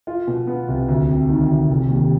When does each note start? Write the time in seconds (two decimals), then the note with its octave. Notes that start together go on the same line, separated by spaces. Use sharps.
0.07 F4
0.27 B2
0.47 B3
0.68 C2
0.88 D2
1.08 C3
1.29 D#3
1.49 D2
1.69 F1
1.89 D#2